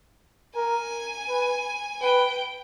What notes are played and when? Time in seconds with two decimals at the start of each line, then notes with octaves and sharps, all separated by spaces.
0.56 A#4 G#5
1.29 B4
2.02 B4 G5